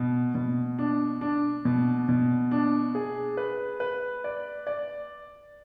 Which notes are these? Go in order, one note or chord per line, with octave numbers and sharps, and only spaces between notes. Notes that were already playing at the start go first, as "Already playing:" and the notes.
Already playing: B2
B2
D4
D4
B2
B2
D4
G#4
B4
B4
D5
D5